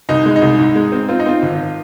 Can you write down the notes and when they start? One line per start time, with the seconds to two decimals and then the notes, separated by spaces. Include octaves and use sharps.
0.09 C2 D#4
0.26 G#3
0.36 D#4
0.42 C2
0.58 G#2
0.76 G#3
0.92 C4
1.09 C4 F4
1.19 D#4
1.26 C4 F4
1.42 G#1